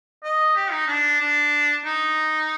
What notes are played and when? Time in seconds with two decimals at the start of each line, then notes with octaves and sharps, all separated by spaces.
0.23 D#5
0.56 G4
0.72 D#4
0.87 D4
1.20 D4
1.85 D#4